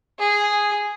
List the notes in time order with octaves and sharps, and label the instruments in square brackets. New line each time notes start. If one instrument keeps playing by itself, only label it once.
[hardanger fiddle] G#4